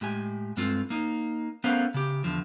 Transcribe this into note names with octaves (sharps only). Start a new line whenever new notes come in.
A2 G#3 G4 G#5
G2 G#3 C4 F4 A4
A#3 D#4
A3 B3 C#4 A#4 C5 F5
C#3 G4
E2 D3 F3